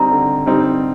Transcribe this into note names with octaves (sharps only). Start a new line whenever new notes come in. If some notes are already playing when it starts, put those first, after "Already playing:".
Already playing: D3 G3 C4 D#4 A#5
D3
G3 C4 D#4